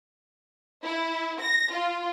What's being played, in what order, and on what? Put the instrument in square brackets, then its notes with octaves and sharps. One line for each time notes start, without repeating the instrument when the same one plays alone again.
[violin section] E4
A#6
F4